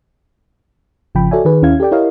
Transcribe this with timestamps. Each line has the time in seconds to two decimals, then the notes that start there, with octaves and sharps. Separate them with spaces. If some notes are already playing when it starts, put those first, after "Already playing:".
1.15 G#1 C#3 F3 G5 B5
1.31 F#4 A4 C#5 D5 E5 G#5
1.45 D#3 G#4 B4
1.62 D#2 C#4 E4 F5 G#6
1.80 G4 A4 D5 G5
1.92 E4 G4 A#4 C#5 D#5 F5